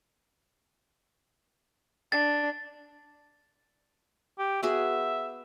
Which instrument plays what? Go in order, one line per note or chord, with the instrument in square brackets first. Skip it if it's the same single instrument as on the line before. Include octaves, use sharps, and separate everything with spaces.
[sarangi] D4 [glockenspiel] A6
[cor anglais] G4
[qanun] B3 F#4 G#4 [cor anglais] E5